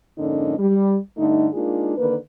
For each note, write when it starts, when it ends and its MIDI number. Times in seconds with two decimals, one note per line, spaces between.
0.18 0.57 41
0.18 0.57 44
0.18 0.57 50
0.18 0.57 58
0.18 0.57 61
0.18 0.57 63
0.59 0.97 55
1.17 1.47 43
1.17 1.47 50
1.17 1.47 57
1.17 1.47 63
1.54 1.94 56
1.54 1.94 58
1.54 1.94 62
1.54 1.94 63
1.54 1.94 65
1.54 1.94 68
1.97 2.15 50
1.97 2.15 51
1.97 2.15 58
1.97 2.15 71